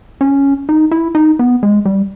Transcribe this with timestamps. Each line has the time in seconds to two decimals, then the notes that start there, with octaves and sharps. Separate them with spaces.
0.21 C#4
0.69 D#4
0.91 E4
1.15 D#4
1.39 B3
1.63 G#3
1.85 G3